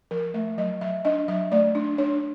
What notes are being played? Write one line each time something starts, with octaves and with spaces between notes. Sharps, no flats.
F3 A#4
A3 E5
F#3 D#5
F#3 E5
D4 D#5
F#3 E5
A3 D5
D4
D4 C#5